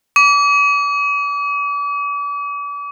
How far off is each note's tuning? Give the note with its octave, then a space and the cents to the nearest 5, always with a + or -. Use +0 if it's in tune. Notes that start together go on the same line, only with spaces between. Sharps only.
D6 -40